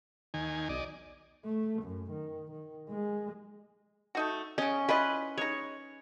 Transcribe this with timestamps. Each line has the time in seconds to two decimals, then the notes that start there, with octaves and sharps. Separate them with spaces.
0.34 D#2 D#3 G#5
0.69 B1 D5 D#5
1.44 A3
1.82 F#2
2.11 D#3
2.51 D#3
2.89 G#3
4.15 A3 D#4 F#4
4.58 C#3 C#4 D#5
4.89 E4 F4 B4 D#5
5.38 G#3 D#4 C#5